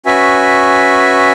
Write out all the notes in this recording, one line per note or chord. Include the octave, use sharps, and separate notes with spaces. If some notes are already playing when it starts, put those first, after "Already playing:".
C#4 F#4 B4 E5 G#5